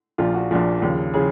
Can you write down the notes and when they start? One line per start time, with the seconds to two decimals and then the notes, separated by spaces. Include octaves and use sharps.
0.18 A#1 A#2 F3 F4
0.34 F#4
0.51 A#1 A#2 F3
0.82 D#2 C#3 F3
1.14 C#3 F3 G#4